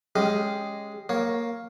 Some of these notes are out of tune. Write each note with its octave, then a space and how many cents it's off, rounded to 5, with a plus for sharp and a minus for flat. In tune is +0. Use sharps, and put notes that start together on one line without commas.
G#3 +0 C#4 +0 G4 +5
A#3 +0 C#5 -5